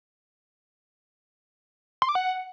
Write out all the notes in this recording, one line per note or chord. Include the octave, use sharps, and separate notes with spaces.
C6
D6
F#5